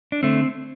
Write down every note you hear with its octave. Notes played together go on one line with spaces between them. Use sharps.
D4
D3 A3 C4